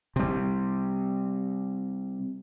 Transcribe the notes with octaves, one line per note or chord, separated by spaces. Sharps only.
C3 G3